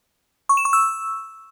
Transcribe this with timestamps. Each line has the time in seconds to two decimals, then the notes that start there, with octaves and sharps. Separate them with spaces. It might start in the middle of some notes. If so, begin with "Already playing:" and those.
0.49 C#6
0.57 E7
0.65 C#6
0.73 E6